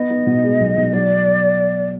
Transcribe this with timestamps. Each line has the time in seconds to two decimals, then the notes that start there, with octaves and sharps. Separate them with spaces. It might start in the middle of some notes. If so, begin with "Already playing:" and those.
Already playing: B3 D#5
0.10 B3
0.26 B2
0.44 G#3
0.60 B1
0.77 B2
0.93 F#3 D5